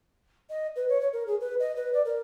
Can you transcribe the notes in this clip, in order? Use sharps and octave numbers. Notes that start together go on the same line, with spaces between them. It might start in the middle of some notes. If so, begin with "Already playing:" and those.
D#5
B4
C#5
C#5
A#4
G#4
B4
D#5
B4
D5
A#4